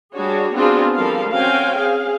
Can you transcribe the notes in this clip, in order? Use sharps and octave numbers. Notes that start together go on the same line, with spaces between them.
G3 D4 F#4 G#4 C#5
B3 C4 D4 F4 F#4 G#4
F3 G3 A4 A#4 F5
C4 C#4 F#4 F5 G5 G#5
G#4 F5